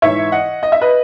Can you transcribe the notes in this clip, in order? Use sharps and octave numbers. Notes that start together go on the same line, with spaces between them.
G#2 E3 C#5 E5
D#5 F#5
D#5
E5
B4 D#5